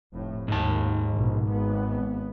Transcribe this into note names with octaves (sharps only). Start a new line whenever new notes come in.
F1 A2
D#2 G#2 A5
A#1 B2
G#1 B3